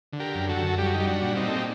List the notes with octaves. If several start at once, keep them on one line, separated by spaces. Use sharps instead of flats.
D3
G4 A#4
F#2
F#4 A4
F#2
G3 G4
F#4
D#4 G4
G3
D4 F#4
A#2
C4 D#4
A#2 A4
G4